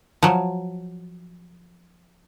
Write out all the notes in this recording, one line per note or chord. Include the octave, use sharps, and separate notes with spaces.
F3 F#3